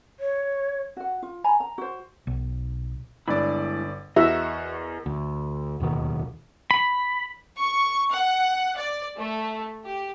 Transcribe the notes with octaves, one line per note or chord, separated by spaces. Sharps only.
C#5
F#4 F#5
F4
G#5 A#5 B5
A#5
F#4 C5
B1
G1 G#3 D4 E4 D5
E2 F#4 A#4 D#5 E5
D2
D1 D#2 B2 D#3
B5
C#6
F#5
D5
A3
G4